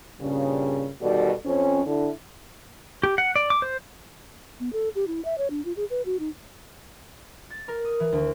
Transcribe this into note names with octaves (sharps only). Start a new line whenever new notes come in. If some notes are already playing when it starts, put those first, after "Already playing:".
G2 A#2 C#3
B2 D#3 G3 A4 D5
F2 C4 C#4
D3 E4
G4
F#5
D5
D6
C5
B3
A4
G4
E4
E5
C#5
D4
F4
G#4
B4
F#4
D#4
A6
A#4
D#6
E3
D2